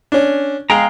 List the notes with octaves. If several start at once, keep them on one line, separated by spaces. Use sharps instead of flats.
C#4 D4
G#3 G#4 F5 G5 A#5